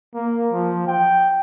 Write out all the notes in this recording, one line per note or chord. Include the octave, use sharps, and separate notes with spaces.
A#3
F3
G5